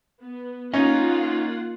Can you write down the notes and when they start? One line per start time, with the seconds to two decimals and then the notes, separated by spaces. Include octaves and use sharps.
0.21 B3
0.74 A#3 C#4 D#4 F4 D#5 F#5